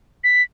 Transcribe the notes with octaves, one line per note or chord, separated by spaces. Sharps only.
B6